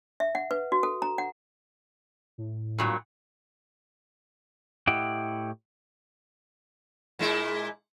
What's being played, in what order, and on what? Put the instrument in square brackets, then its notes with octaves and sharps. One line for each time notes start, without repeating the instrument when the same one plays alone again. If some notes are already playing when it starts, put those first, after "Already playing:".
[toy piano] E5
F#5
B4
F#4
A4
A#5
F#5
[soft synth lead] A2
[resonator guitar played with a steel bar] G2 A#2 F#3
[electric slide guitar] A2 E4 G4 D#5 F#5 G5
[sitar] A#2 G#3 E4